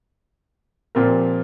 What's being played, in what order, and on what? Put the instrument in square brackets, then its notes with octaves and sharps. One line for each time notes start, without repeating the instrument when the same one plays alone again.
[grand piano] A#2 F3 C4 G4 A#4